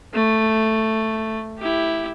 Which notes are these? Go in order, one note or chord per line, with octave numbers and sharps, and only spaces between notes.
A3
E4 G4